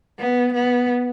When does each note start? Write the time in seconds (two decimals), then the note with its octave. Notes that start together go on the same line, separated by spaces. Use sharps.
0.19 B3
0.54 B3